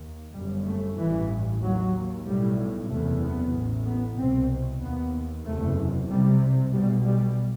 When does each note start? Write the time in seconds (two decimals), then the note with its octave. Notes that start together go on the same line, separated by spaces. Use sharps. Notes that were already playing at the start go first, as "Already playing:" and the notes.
Already playing: D#2
0.33 G1 F#2 G3
0.66 A3
0.97 A1 G2 E3
1.61 D#2 F#3
2.26 B1 A2 G3
2.89 F#1 E2 C3 A3
3.22 B3
3.54 A1 A2
3.85 B3
4.17 C2 B2 C4
4.81 D#2 B3
5.45 F#1 E2 C3 A3
6.09 C2 C3 G3
6.73 B1 B2 G3
7.05 G3